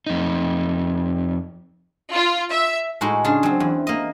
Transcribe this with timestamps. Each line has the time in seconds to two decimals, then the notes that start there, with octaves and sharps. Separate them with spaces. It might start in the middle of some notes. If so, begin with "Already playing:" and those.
0.07 F2 D#4
2.13 F4
2.52 E5
3.01 A2 G#3 D#4 F#4
3.25 C#3 D4 G#4 C6
3.43 F#3 C4
3.60 E2
3.87 A#3 D#5